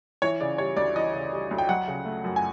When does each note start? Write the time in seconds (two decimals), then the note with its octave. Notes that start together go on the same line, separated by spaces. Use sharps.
0.22 E3 C#5
0.41 C#3 D5
0.58 G3 C#5
0.77 D2 D5
0.96 E3 D#5
1.14 C#3
1.32 G3
1.51 D2
1.58 G5
1.69 F#3 F#5
1.88 C#3
2.05 A3
2.24 F#2
2.36 G#5